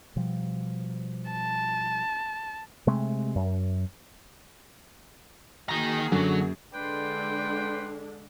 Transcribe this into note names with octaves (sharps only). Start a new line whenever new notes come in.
B2 F3 G3
A5
C3 G#3 A3
F#2
D#3 A#3 F#4 G#4 A#5
F#2 D3 F#3
D3 G#3 D4 B4 D5 G5 C6